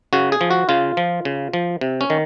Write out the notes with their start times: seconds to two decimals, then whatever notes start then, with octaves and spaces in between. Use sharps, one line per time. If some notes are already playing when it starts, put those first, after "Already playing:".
0.13 C#3 F#4
0.32 G#4
0.41 F3
0.51 F#4
0.69 C#3 F4
0.97 F3
1.25 C#3
1.53 F3
1.81 C3
2.01 C#4
2.10 D#3